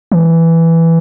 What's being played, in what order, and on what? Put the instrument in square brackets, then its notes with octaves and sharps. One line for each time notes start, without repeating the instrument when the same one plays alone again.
[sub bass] E3